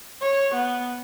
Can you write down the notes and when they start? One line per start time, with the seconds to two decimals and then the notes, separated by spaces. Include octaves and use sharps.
0.21 C#5
0.54 B3